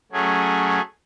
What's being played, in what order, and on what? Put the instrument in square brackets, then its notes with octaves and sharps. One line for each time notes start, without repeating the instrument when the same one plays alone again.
[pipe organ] F#3 A3 C#4 G#4